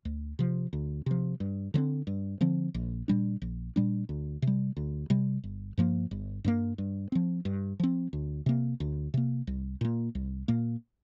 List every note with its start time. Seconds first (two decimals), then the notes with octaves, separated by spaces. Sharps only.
0.05 D2
0.39 C3 F3
0.73 D2
1.06 C3 F3
1.40 G2
1.74 D3 F3 C4
2.07 G2
2.41 D3 F3 C4
2.74 A#1
3.08 A#2 G3 D4
3.42 A#1
3.76 A#2 G3 D4
4.09 D2
4.42 C3
4.47 G3
4.77 D2
5.10 C3 G3
5.44 G1
5.78 G2 F3 A#3
6.11 G1
6.44 G2 F3 A#3
6.78 G2
7.12 F3 C4
7.45 G2
7.80 F3 C4
8.13 D2
8.46 C3 A#3
8.80 D2
9.14 C3 A#3
9.47 C2
9.81 A#2 A#3
10.15 C2
10.48 A#2 A#3